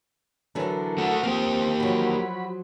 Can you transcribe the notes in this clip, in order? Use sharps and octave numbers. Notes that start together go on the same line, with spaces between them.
D3 E3 F#3 A4 A#4
A3 F#4
F3 A#3 C4 G4
F3 F#3 F#4 B5